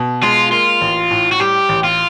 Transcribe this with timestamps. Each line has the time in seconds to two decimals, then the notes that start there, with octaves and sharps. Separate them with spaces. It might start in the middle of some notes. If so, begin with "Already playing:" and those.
Already playing: B2
0.23 G#3 F4
0.52 A#3 F4
0.81 A1
1.11 A2
1.32 F#4
1.40 G3 G4
1.69 A1
1.84 F4